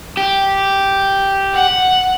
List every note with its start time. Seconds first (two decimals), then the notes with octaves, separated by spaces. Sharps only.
0.17 G4
1.53 F#5